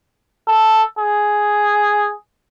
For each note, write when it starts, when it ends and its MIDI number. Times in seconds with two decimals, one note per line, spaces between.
0.48 0.83 69
0.99 2.13 68